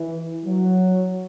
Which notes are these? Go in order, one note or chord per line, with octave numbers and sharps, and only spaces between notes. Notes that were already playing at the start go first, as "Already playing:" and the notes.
Already playing: E3
F#3